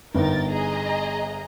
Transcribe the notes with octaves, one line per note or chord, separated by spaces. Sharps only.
G1 B3 D#4 A#4 G5 A6
G#4 D#5 A#5